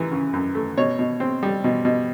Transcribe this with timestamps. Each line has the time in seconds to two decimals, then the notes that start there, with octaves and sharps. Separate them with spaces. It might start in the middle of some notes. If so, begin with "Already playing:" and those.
Already playing: F#2 E3
0.11 C#3
0.33 F#2
0.55 A3
0.77 B2 C#5
0.99 B2
1.20 C4
1.43 G3
1.64 B2
1.85 B2